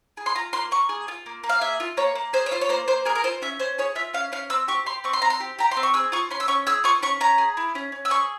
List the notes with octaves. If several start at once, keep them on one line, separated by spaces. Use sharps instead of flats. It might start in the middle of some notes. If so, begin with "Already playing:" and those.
G#4
C6
F4 A#5
A#3 C6
A#3 C#6
G#4
F4
A#3
A#3
F5
G#4 E5
F4
A#3 C#5
A#3
G#4 C5
C#5
F4 C5
C#5
A#3 C5
A#3 C5
G#4 A#4
A#4
F4 C5
C#4 E5
C#4 C5
G#4 C#5
F4 E5
C#4 F5
C#4 F5
C4 E6
G4 C#6
G4 C6
C4 C#6
C6
C4 A#5
C6
G4
G4 A#5
C6
C4
C#6
G#4 E6
F4 C#6
C#4 C6
E6
C#4 C#6
G#4 E6
F4 C#6
C#4 C#6
C#4 A#5
G#4
E4
C#4
C#4
E6
G#4 C#6